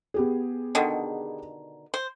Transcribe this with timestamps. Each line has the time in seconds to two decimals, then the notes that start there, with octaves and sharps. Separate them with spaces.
0.14 B3 G4 G#4
0.75 B2 D3 D#3
1.94 C5